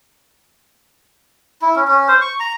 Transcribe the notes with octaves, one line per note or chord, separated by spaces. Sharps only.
E4
C#4
C#4
C5
C#6
A#5